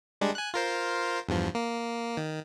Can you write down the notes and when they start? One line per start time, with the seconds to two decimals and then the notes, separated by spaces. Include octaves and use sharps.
0.21 G3 G#3 D4
0.35 G#5 F#6
0.54 F4 A#4 C5
1.28 E2 G2 F3
1.55 A#3
2.17 D#3